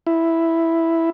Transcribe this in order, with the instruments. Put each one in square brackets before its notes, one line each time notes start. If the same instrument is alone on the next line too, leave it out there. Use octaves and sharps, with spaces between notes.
[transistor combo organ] E4